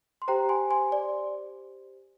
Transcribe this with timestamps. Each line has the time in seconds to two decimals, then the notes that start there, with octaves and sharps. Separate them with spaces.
0.22 C6
0.28 G4 C5 G5 A#5
0.49 G#5 C6
0.71 G#5 C6
0.92 D5